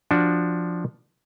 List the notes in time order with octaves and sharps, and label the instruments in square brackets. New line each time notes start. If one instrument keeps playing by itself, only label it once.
[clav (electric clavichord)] F3 D4 F#4